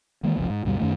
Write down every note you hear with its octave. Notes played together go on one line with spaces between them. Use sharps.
D#3 E3 G#3 A#3
F#1 C2 F3
G#2
D2 G2 B2 G3
F#2 D#3 A3